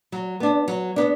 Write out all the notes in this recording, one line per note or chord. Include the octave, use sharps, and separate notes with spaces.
F#3
B3 D4
F#3
B3 D4